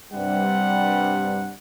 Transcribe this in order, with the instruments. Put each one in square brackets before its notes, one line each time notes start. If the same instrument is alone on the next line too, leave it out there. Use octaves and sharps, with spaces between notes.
[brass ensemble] G2 C3 G3 [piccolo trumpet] F#5